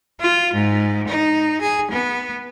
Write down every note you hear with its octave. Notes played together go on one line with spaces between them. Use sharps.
F4
G#2
D#4
G#4
B3